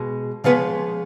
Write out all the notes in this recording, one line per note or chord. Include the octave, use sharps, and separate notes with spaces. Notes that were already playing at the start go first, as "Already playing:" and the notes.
Already playing: B2 G#3
C#3 F3 G#3 B3 B4